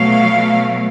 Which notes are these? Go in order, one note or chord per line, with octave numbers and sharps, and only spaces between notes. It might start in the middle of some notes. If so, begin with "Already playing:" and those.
Already playing: B2 F#3 A3 F5